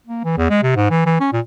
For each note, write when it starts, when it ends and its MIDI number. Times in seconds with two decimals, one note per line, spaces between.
0.07 0.24 58
0.24 0.36 52
0.37 0.47 40
0.50 0.62 56
0.63 0.72 48
0.76 0.90 44
0.90 1.04 52
1.06 1.16 52
1.21 1.29 61
1.33 1.40 46